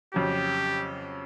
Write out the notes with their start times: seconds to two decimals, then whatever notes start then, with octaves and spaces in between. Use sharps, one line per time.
0.14 F2 C#3 F#3 G4